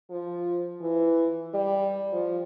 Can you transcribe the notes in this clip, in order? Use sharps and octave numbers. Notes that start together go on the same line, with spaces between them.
F3
E3
G3
F3